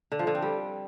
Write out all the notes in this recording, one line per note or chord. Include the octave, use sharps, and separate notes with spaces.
D3
F3
D3
C4
G3